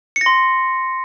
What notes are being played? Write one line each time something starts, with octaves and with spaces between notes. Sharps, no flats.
C#7
A#6
C6